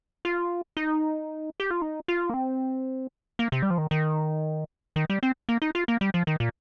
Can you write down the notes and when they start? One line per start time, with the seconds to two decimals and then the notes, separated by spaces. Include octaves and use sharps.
0.25 F4
0.77 D#4
1.60 G4
1.71 F4
1.82 D#4
2.08 F4
2.30 A#3
2.34 C4
3.39 A#3
3.52 C3
3.63 G3
3.70 F3
3.78 D#3
3.91 D#3
4.96 D#3
5.10 G3
5.23 C4
5.49 A#3
5.62 D#4
5.75 F4
5.88 A#3
6.01 G3
6.14 F3
6.27 D#3
6.40 A#2